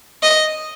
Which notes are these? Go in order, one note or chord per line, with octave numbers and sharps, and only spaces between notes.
D#5